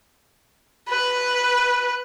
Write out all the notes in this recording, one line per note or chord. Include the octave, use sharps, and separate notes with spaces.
B4